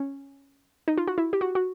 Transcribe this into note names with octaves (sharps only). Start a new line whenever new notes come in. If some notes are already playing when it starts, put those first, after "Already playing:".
Already playing: C#4
D#4
F4
F#4
E4
G4
F#4
F#4